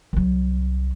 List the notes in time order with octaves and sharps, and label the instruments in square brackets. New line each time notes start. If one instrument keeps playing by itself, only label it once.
[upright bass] C2 F#3